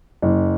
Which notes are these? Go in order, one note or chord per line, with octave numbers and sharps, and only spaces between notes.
F#1